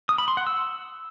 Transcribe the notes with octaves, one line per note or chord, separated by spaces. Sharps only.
D#6
B5
C6
F#5
E6